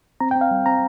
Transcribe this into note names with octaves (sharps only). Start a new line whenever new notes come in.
C4 A#5
G5
C4
F5
G3
C4 A#5